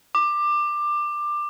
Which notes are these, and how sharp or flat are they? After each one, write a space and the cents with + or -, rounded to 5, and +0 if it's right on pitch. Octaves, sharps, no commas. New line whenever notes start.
D6 +20